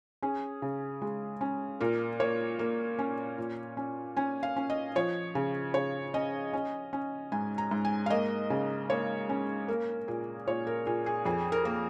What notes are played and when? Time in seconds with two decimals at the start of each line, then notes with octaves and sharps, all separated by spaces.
0.22 C#4 G#4
0.62 C#3
1.02 G#3
1.41 C#4
1.81 A#2 A#4
2.20 A#3 C#5
2.59 A#3
2.99 C#4
3.38 A#2
3.77 C#4
4.17 C#4 G#5
4.43 F5
4.56 C#4
4.70 D#5
4.95 F3 C#5
5.35 C#3
5.74 C#3 C#5
6.14 C#4 D#5
6.53 C#4
6.93 C#4
7.32 G#2 G#5
7.58 A#5
7.71 G#2
7.85 G#5
8.06 F5
8.10 A#3 D#5
8.50 C#3
8.90 A#3 C#5
9.29 C#4
9.68 A#3 A#4
10.08 A#2 G#4
10.47 A#2 C#5
10.67 A#4
10.86 A#2 G#4
11.06 G#4
11.25 F2 G#4
11.52 A#4
11.65 A#3